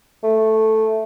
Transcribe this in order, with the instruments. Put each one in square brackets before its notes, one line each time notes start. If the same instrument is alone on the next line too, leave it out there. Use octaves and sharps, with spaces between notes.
[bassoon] A3